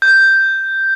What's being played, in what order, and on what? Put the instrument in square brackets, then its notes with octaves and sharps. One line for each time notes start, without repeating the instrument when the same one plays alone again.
[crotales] G6